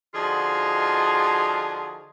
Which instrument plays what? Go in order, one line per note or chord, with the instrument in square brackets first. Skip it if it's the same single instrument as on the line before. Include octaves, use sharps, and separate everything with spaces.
[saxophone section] D3 F3 D#4 F4 F#4 G#4